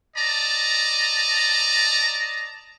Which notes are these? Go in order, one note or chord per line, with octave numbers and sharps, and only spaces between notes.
D5 D#5 A5 A#5